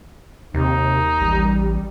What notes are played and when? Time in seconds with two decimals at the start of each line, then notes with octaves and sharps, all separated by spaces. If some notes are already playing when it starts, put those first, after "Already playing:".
0.54 D#2 C3 D#4
1.21 A1 G3